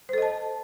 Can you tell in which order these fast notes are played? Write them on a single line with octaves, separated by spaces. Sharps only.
C5 A4 D#5 A5